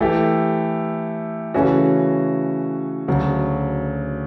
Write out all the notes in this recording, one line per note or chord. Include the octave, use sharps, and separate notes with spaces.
E3 A3 E4 G4
C#3 E3 A3 C#4 F#4
D2 C#3 F#3